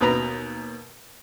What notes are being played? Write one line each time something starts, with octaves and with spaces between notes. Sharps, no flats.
D#2 B2 B4 A#5